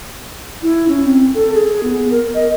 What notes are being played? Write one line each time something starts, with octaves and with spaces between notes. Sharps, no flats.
E4
C#4
C4
A4
G#4
B3
A#4
D#5